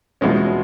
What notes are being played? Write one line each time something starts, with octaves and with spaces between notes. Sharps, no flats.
E2 B2 G#3 C#4